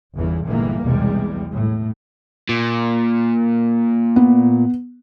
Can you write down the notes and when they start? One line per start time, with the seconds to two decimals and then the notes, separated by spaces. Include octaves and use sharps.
0.15 G1 E2 C#3 E3
0.45 G1 A#2 E3 G3 G#3 A#3
0.83 B1 E2 C3 G3 G#3
1.51 A2
2.49 A#2
4.16 B3